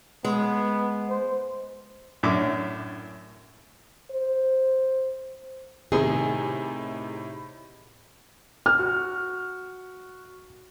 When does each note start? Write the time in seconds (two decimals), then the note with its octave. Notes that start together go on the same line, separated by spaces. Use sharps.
0.25 G#3 B3
1.10 C5
2.23 F#2 A2 C#4 D4 E5 D6
4.11 C5
5.92 A2 C3 D#3 G#4
8.66 F6
8.79 F#4